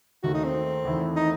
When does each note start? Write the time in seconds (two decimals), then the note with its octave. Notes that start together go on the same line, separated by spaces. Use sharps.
0.23 D#2 D#3 A3 F#4
0.34 D#4
0.44 C4
0.85 E2 D#3 A3 E4
1.16 D#4